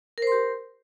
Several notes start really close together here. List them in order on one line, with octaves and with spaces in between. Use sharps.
A#4 C5 C6 G4